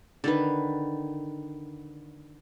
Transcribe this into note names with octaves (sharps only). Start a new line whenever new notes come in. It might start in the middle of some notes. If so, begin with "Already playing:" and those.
D3 D#3 B4